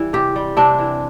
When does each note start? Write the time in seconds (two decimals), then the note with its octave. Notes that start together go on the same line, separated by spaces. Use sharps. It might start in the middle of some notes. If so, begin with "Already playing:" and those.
Already playing: E3 G3
0.13 C3 G4
0.36 G3
0.57 C3 D4
0.79 E3